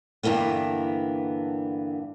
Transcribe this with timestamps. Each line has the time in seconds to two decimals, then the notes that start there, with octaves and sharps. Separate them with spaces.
0.23 G2 D3 E3 A#3 B3